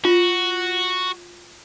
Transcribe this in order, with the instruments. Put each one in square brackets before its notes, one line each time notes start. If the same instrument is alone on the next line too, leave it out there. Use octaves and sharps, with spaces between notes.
[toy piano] F4 [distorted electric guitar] F#4